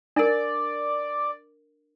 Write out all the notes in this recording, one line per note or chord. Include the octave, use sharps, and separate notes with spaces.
D4 A#4 D5